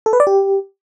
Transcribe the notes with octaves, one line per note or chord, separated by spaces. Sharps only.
A4
B4
D5
G4